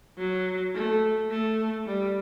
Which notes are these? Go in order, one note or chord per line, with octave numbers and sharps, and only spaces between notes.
F#3
A3
A3
G3